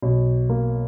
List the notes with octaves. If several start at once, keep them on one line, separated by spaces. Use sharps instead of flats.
B1
A#3